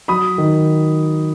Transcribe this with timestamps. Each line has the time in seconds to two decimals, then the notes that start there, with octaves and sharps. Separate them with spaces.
0.08 F#3 B5 D#6
0.38 D#3